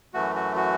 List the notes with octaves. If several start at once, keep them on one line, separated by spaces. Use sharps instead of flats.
F#2 E3 A3 F#4
F#4
F#4